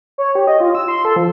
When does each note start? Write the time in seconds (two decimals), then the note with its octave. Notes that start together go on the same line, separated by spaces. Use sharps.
0.18 C#5
0.35 G4
0.47 D#5
0.60 F4
0.75 E6
0.88 C6
1.05 A4
1.16 F3